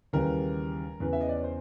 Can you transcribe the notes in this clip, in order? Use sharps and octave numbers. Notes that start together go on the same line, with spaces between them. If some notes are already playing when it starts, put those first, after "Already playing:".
D#2 C#3 E3 G3 A#4
E2 C#3 E3 B4
E5
D#5
D5
C#5
C5